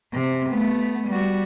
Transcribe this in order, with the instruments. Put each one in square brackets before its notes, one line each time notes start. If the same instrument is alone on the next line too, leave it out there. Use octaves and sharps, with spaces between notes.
[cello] C3
A3 B3
G3 F#4